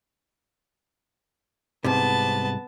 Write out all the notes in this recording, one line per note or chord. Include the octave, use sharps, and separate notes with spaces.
C2 G#2 C3 B3 A5